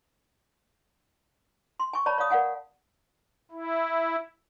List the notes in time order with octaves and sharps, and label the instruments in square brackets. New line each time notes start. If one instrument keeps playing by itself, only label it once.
[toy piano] C6
G#5 C#6
C#5 D5 A5 B5
C#5 D5 F5 D#6
A#4 D5 F5 F#5 G#5
[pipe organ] E4